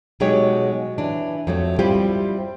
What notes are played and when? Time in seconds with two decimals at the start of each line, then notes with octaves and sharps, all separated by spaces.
0.20 B2 F#3 G#3 D#4 G4 C#5
0.98 E3 D4
1.47 F2 F#3 A3
1.79 G3 C4 E4 F4 G4